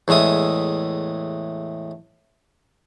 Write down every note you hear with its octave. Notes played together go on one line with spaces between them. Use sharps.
E2 A2 G#3 E5 D#6